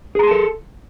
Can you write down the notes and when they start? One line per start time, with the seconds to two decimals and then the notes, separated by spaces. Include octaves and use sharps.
0.15 G#4
0.19 A#5
0.23 C6
0.27 A5
0.31 A4